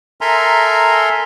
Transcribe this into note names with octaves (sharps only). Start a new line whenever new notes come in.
A4 A#4 E5 G#5 A#5 C6